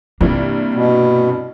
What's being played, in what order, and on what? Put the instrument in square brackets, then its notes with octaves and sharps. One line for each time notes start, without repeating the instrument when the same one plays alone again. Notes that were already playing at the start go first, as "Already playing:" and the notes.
[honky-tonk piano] G2 C3 E3 [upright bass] A#3
[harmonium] B2